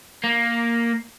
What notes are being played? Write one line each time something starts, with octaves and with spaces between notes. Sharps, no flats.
A#3